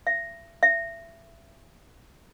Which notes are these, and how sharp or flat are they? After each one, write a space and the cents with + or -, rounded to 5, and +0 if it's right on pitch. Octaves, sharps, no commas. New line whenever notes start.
E5 +35
E5 +25